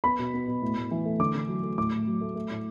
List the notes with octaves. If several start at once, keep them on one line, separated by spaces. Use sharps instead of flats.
B3 B5
B2
B3
B2
A2
A2
E3
A3
D3 D6
D3
F#3
A3
A2 D6
A2
F#3
A3
A3
A2